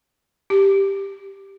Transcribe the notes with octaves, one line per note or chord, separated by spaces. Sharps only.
G4